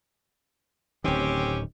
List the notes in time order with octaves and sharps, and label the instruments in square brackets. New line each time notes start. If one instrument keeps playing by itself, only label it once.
[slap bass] D1 D#3 [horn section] C4 C#4 G4